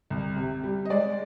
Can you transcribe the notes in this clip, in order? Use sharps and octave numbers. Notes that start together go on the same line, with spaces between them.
C2
C3
G3
D#5
G#3 D5